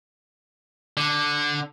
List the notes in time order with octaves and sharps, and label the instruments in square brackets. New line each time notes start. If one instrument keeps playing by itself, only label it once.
[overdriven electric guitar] D3